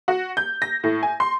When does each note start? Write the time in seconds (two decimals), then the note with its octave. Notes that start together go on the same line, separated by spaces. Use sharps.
0.08 F#4
0.37 G6
0.62 A#6
0.84 A2
1.03 G#5
1.20 C6